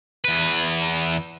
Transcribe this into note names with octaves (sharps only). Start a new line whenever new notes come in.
E2 B4